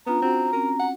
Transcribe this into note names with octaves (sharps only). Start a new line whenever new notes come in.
B3 C#4 D4 F4 A#5
C4 F#4 F#5
C4 C#4 A#4
F#5